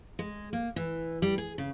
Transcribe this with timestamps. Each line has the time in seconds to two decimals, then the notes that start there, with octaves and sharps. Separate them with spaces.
0.19 G#3
0.53 A#3
0.76 E3
1.22 G3
1.38 G#4
1.58 C#3